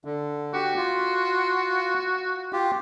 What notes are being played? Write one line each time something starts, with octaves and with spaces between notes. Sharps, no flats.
D3
F#4 G4
F4
F4 G4